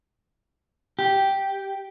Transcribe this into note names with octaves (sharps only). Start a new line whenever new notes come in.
G4